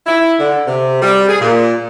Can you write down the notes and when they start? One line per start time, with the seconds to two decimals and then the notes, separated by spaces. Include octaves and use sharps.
0.06 E4
0.39 D3
0.66 C3
1.01 G3
1.28 G#4
1.40 A#2